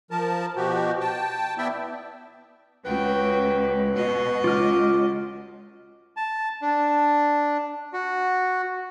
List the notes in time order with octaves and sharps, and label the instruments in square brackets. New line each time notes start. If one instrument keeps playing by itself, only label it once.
[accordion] F3 A#4 A5
B2 F3 F#4 G4
G5 A5
B3 E4 D5 E5 G5
[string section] C#2 [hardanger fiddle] F#4 G5 [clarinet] B4
[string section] B2 [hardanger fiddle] F#4 D#5
[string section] C#2 [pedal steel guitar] F4 F6 [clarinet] D6
[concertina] A5
D4
F#4